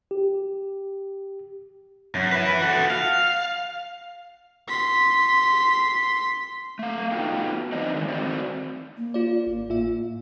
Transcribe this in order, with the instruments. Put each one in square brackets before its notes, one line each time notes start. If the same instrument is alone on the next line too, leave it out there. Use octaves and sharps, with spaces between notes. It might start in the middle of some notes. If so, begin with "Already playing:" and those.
[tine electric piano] G4
[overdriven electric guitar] F#2
B4 E5
F#4 A4
F5
[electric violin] C6 B6
[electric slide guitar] A3 F5
A3 B3 D#4 F4 F#4 G5
E3 F#3 C4 D4 D#4 D#5
D#3 G#3
D#3 A3 C4 F#4 D5
[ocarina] A#3
[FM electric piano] F4 D5
G#1
A2 F4 E5